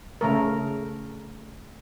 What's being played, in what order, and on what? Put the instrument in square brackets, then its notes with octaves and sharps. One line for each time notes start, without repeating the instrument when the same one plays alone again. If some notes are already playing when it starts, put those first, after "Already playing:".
[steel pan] C#3 A3 A#4